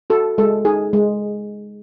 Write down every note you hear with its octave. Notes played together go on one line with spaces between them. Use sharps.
F#4 A4
G#3 A4
D#4 G#4
G#3